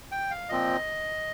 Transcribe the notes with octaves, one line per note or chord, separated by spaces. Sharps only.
G5
F5
A#2 F3 C4 D#5